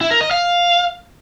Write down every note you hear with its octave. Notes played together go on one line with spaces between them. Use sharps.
E4
A#4
D#5
F5